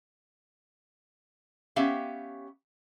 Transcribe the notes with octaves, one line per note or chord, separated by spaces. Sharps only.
B3 C#4 G4 E5 F5